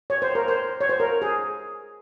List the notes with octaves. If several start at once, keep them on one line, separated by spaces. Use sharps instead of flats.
C#5
C5
A#4
C5
C#5
C5
A#4
G#4